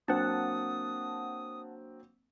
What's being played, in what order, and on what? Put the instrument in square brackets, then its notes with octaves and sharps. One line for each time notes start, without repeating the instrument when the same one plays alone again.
[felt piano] F#3 A#3 C4 [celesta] D4 [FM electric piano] F#5 A5 [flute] D#6